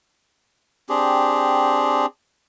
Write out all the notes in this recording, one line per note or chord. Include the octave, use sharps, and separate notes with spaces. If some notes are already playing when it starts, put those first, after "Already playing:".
C4 D4 G4 G#4